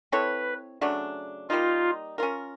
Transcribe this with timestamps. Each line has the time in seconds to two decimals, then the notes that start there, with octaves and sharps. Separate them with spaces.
0.12 C4 E4 A4 B4 C#5
0.81 C#3 F#3 A3 D4
1.49 G3 A#3 D#4 F4
2.18 C#4 F4 A#4